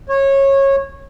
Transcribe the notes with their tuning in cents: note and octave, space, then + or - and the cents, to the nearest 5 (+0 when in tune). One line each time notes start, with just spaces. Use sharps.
C#5 -20